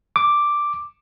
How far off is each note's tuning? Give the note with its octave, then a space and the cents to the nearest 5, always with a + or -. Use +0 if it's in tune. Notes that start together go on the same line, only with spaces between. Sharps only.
D6 +0